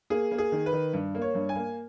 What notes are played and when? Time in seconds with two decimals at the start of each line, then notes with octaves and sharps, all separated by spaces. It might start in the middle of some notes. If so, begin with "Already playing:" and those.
0.10 A#3 G#4
0.31 A#3
0.38 G#4
0.52 D#3
0.66 B4
0.73 D#3
0.94 G2
1.15 A#3
1.22 C#5
1.35 G2
1.49 G#5
1.56 A#3